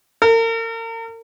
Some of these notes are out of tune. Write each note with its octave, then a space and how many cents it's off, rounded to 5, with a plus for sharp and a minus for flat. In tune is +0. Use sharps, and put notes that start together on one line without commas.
A#4 -40